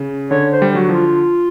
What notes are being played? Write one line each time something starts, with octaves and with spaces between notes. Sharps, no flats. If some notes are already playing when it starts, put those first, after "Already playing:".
Already playing: C#3
D3 C#5
C5
G3
F#3 F#4
F3
F4